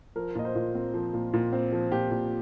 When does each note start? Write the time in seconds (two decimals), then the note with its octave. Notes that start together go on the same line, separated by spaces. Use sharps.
0.16 F3 A#4
0.35 A#2 D#5
0.45 C5
0.55 A#2
0.75 C4
0.94 F3
1.14 A#2
1.34 A#2
1.53 C4
1.72 F3
1.92 A#2 G4
2.11 A#2